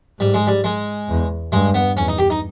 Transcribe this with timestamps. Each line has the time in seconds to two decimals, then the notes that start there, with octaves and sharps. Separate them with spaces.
0.19 G#2 G3
0.34 G#3
0.47 G3
0.64 G#3
1.09 E2
1.52 G2 G#3
1.74 B3
1.97 E2 C#4
2.08 D#4
2.18 G4
2.30 D#4